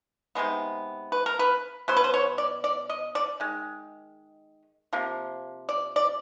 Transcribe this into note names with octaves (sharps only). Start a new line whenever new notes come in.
C3 D#3 G#3 B3
B4
A#4
B4
B2 F#3 B3 C5
B4
C5
C#5
D5
D5
D#5
D5
D#3 G#3
C3 F3 A#3
D5
D5